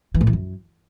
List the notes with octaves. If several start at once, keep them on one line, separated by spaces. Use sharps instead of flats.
E3
A2
E3
F#2